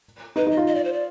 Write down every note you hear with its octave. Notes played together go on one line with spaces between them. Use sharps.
D#4 B4
D#4
D#5
F4
D#5
D5
C5
D5